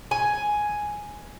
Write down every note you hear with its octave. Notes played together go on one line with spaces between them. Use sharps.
G#5